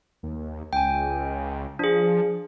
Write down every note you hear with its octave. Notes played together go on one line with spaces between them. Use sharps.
D#2
C#2 G5 G#5
F3 D4 G#4